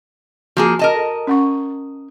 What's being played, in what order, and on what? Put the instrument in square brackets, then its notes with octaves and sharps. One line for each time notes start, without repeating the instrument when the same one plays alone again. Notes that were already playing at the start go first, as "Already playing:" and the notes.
[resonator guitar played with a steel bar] F3 A#3 G#4 [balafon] F#4
[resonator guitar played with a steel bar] A#4 D#5 A5
[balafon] A4
C#4 F#5 C#6